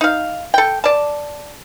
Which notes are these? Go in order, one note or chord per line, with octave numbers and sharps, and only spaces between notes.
D#4 F5
A4 G5
D5 A5